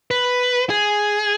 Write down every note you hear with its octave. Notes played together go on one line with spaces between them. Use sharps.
B4
G#4